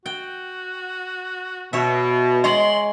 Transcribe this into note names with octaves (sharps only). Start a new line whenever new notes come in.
F#4 G5
B2 C#5 E5
G#3 C#5 D#5 A#5 C6 F#7